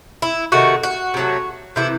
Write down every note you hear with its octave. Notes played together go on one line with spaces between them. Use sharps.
E4
C3 D#3 A3 F#4
F#4
C3 F#3 A3
C3 E3 A3 E4